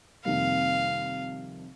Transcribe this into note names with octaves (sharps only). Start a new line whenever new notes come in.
F2 C3 D#3 G3 A#3 F5